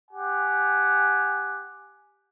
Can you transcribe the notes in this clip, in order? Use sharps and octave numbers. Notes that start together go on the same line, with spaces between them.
G4 F#5 G#5